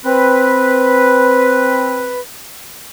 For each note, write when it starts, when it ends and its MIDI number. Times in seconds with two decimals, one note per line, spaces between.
0.05 2.20 60
0.05 2.20 71